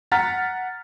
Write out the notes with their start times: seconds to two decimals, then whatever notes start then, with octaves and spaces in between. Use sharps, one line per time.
0.12 F#5 A#5 F6 A6 B6